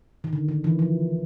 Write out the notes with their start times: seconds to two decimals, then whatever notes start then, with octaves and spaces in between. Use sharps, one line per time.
0.24 D#3
0.33 D3
0.49 D#3
0.64 E3
0.79 F3